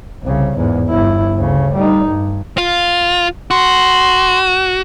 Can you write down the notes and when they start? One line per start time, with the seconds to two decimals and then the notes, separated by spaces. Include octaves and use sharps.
0.23 C2 C#3
0.57 E2 G#2
0.88 G1 E4
1.36 D2 C#3
1.75 G3 D#4
2.05 G2
2.58 F4
3.51 F#4 C6